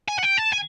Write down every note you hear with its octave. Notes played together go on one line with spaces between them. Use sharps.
G#5
F#5
G5
A5
G#5